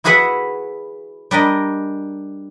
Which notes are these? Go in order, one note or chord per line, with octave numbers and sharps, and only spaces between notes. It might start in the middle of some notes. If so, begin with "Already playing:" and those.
E4 F#4 G#4 B4 E5 F#5
G3 D4 A#4 D#5